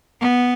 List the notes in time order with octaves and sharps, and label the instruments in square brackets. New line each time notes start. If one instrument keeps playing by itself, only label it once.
[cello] B3